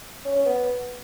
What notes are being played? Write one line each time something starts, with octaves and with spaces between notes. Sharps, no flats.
C#4
C#4
B3